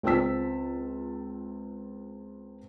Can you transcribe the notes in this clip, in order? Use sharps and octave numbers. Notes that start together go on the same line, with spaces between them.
C#2 C4 F4 A5 E6 B6